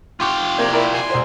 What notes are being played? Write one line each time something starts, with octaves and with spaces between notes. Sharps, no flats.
F4 G4 G5 C6 C#6
C3 A#3 D5 G#6
E4 A#4 D5
G#5 C6
E1 C5